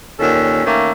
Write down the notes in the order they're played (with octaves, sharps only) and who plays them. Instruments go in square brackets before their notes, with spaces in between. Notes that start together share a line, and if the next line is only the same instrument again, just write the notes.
[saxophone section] D#2 A#2 C#4 A4
D#3 A3 A#3 C#4